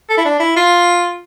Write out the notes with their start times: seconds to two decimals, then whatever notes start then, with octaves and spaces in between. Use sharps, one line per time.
0.09 A4
0.18 E4
0.25 D4
0.40 E4
0.56 F4